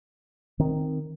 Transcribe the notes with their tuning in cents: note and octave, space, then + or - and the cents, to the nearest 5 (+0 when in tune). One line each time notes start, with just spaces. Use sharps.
D#3 +0 C4 +0